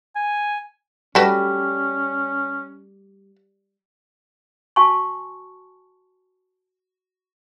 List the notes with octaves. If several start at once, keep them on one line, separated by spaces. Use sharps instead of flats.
G#5
G3 A3 C#4 F#4 B4
F#4 F5 G#5 A5 C6 C#6